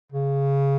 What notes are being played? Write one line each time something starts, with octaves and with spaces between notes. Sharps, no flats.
C#3